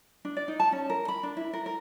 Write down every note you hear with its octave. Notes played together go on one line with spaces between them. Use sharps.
D4
D5
D#4
A5
C#4
A#4
B5
D4
E4
A#4
A#4